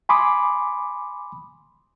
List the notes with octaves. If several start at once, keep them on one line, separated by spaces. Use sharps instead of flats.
G#5 B5 C6 D6 D#6